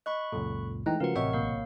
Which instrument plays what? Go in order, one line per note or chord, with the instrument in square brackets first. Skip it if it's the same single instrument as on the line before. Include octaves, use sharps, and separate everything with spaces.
[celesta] D#5 [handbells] B5 C#6 F#6
[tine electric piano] C#2 F#2 A#2 [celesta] A4
[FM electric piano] E3 D#4 A#5 [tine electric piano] G#3 A3 [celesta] G5 F#6
[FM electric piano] C#3 F3 [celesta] F#4 B4 F5 [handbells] A#4 F#5
[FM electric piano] A1 C3 C#5 [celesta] D#5 [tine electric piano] E5 G5 [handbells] F#5 C#6
[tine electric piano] B1 [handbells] A#3 F5